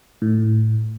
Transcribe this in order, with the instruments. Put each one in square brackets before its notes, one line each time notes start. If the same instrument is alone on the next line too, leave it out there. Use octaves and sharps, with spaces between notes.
[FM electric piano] A2